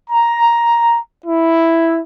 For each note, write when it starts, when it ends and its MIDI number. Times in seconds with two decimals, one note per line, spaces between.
0.10 0.99 82
1.25 1.99 64